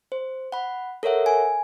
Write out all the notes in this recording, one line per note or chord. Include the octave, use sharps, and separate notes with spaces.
C5
F#5 B5
A4 A#4 C#5 E5 F#5
G#5